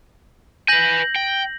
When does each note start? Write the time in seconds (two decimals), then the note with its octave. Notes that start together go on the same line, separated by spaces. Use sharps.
0.68 B4 G#5 G6 A#6 F#7
1.16 G5